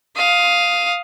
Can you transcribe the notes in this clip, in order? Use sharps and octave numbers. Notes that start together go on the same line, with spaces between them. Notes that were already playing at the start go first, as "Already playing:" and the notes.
F5 D#6